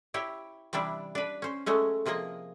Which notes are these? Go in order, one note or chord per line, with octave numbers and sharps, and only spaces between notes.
E4 G4 C#5
C3 E3 G3 D4 E4
D4 B4
C#4 C5
F#3 G#3 A3 C#4
C3 F3 A#3 G#4 D#5